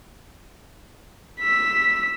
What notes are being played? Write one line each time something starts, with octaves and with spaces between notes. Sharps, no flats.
E6 B6